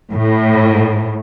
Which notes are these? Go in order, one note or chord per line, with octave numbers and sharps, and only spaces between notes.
A2